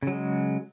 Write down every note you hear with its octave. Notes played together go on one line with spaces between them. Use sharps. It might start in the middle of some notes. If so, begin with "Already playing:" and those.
C#3 F#3 G#3